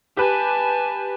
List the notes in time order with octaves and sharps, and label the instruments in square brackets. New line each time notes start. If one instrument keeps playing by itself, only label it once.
[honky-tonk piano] G4 B4 [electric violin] G#5 A5